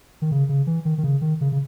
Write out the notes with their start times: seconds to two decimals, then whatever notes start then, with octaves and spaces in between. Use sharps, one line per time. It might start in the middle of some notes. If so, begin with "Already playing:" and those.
0.22 D#3
0.31 C#3
0.49 C#3
0.67 E3
0.85 D#3
0.98 D#3
1.04 C#3
1.21 D#3
1.41 C#3
1.52 C#3